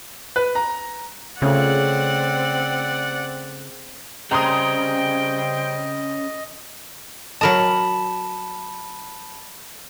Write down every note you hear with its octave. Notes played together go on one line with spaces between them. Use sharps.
B4
A#5
C#3 A3 C4 C#4 F4 D5 F#5
C#3 G3 C4 D#5 G5 A#5 C6 D#6
F#3 A#4 D#5 A5 B5